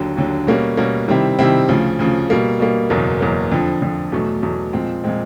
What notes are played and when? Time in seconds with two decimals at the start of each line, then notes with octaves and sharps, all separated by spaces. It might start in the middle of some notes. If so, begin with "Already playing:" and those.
Already playing: D#2 D3 F#3
0.17 D#2 D3 F#3
0.47 B2 G3 A#3 C#4 F#4
0.77 B2 G3 A#3 C#4 F#4
1.08 C3 D#3 G3 C4 E4
1.39 C3 D#3 G3 C4 E4
1.69 D2 C#3 F3
1.99 D2 C#3 F3
2.30 B2 G3 A#3
2.60 B2 G3 A#3
2.90 F#1 E2 B2 F#3 A#3
3.21 F#1 E2 B2 F#3 A#3
3.52 F2 D3 F3
3.82 F2 D3 F3
4.12 E2 B2 F#3 A3
4.42 E2 B2 F#3 A3
4.73 A#2 F3 G#3 C4
5.04 A#2 F3 G#3 C4